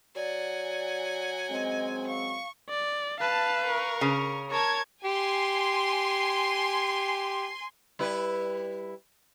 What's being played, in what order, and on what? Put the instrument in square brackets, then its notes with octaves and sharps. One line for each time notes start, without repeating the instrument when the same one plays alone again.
[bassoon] F#3 [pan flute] D5 [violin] F#5 G#5
[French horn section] F#2 G#3 C4 [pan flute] D#5
[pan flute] F5 [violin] C#6
[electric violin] D5
[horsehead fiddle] B4 [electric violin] F5 [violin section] A5
[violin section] A#4 C#6
[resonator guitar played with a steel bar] C#3
[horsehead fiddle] A#4 [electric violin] C#5 [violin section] A5 G#6
[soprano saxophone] G4 [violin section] G#5 C6
[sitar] G3 E4 B4